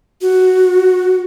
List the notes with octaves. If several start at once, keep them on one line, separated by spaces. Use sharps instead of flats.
F#4